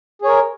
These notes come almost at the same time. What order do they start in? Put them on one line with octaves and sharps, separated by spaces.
G#4 C#5 A#4